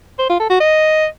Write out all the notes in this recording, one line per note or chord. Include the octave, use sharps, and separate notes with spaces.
C5
F4
A4
F#4
D#5